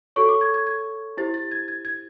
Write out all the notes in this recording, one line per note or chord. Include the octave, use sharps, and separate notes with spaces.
F#4 A4 C#5 C#6
D6
G#6
G#6
G#6
E4 G4 C5 A6
A6
G#6
G#6
G#6